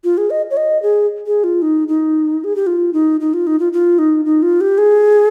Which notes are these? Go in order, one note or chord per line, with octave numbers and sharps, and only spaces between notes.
F4
G#4
D#5
C#5
D#5
G#4
G#4
F4
D#4
D#4
G#4
G4
F4
D#4
D#4
F4
D#4
F4
F4
D#4
D#4
F4
G4
G#4